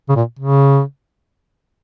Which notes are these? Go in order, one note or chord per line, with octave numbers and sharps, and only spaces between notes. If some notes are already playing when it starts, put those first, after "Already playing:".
C#3
A#2
C#3